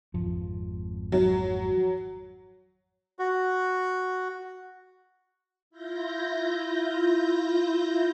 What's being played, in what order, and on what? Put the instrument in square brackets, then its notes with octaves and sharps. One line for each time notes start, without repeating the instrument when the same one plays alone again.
[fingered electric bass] G#1 F2 F3
[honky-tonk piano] F#3
[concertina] F#4
[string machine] E4 F4 G6 A#6